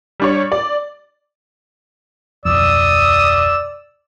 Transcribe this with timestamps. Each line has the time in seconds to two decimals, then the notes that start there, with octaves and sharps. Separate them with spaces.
0.20 G3 D4 C#5
0.52 D5
2.45 D1 B1 F2 D5 D#6 E6